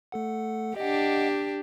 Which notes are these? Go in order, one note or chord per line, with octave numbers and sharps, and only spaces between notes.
A3 A4 F#5
D4 G4 D#5 F#5